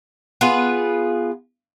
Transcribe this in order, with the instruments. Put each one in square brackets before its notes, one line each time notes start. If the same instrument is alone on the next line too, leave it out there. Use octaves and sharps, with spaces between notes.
[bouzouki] B3 F4 G#4 B4